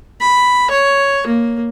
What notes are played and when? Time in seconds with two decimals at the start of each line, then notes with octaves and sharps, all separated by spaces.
0.21 B5
0.70 C#5
1.27 A#3